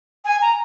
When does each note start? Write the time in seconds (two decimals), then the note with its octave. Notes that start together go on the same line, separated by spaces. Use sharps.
0.25 G#5
0.41 A#5